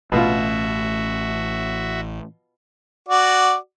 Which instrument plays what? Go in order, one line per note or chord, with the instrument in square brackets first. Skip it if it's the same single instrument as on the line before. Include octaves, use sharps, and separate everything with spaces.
[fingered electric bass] A1 A3 C#4 [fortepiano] B2 F4 [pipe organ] F#4 E5
[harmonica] F#4 D5